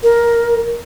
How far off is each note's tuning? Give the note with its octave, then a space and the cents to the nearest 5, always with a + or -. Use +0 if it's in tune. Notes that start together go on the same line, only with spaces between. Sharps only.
A#4 +10